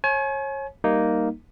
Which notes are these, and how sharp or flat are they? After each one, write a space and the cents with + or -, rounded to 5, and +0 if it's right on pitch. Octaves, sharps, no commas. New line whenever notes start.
C#5 -30 G#5 +35
G3 +0 A#3 +0 D#4 +0